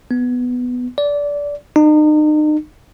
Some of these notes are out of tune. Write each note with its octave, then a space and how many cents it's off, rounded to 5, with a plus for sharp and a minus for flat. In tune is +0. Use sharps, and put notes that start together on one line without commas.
B3 +5
D5 -20
D#4 -40